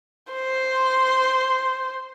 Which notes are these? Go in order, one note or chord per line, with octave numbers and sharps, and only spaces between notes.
C5 C6